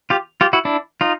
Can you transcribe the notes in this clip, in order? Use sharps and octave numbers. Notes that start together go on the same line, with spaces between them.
F4 G4
F4 G4
E4 F#4
D4 E4
D#4 F4